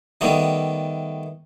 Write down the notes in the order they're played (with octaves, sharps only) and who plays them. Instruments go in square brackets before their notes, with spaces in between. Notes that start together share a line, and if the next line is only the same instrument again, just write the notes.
[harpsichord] D#3 G3 A3 B3